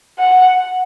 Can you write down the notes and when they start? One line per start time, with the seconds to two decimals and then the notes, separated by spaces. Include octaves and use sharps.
0.19 F#5